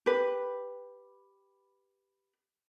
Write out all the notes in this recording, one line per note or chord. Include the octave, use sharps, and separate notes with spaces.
G4 B4